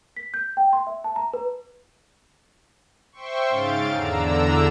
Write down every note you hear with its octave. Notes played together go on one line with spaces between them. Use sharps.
B6
G6
G5
C6
E5
A5
A#5
B4
C5 E5 G5 C6 C#6
G#2 C#3 F5 A6 D7
E2 D3 D4 A#5 E6